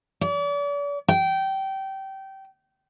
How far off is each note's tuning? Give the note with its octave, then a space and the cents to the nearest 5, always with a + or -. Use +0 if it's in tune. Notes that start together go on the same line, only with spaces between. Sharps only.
D5 -40
G5 -20